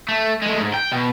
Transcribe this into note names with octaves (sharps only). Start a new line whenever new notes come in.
A3
G#3 A3
G#2
G5
B2